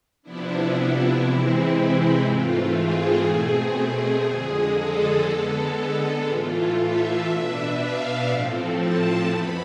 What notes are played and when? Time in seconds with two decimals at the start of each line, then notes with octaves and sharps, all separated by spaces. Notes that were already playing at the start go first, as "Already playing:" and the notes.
0.23 C3 F3 B3 D4 E4
1.23 C3 E3 G#3 C4 E4
2.24 G#2 E3 A3 C4 F4
2.75 G#4
3.24 B2 A3 C4
4.25 F2 D3 G#3
4.76 A4
5.26 D3 G#3 B3
6.27 A2 E3 A3 F4
6.78 E5
7.28 B2 B3 D4 E5
7.78 F5
8.29 A2 F3 A3 C4
8.79 A5
9.29 F2 E3 B3 B5